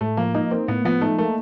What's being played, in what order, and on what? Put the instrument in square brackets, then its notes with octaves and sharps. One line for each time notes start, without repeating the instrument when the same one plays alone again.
[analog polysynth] A2 [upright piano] A3
[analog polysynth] F3 [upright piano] A#3
[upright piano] A#3 [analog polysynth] D#4
[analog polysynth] A#3 [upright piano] C4
[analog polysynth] A2 [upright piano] B3
[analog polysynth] F3 [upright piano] B3
[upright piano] A3 [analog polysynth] D#4
[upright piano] A3 [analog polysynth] A#3